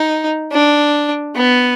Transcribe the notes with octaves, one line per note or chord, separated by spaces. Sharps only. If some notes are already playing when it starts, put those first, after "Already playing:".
Already playing: D#4
D4
B3